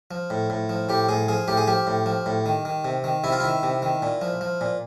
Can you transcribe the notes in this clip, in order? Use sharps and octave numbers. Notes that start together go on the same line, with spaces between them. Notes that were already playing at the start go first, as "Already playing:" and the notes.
F3
A2
A2
F3
A2 G4
A2 G#4
F3 G#4
A2 G4
G#4
F3 G4
A2
F3
A2
D#3
D#3
C3
D#3
C3 E4
F4
D#3 E4
C3
D#3
A#2
F3
F3
A#2